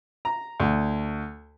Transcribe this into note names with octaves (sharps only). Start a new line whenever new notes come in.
A#5
D2